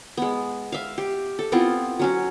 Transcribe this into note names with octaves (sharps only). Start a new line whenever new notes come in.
G#3 B3
E5 F5
G4
A4
B3 C4 E4 F4
F#3 C#4 F#4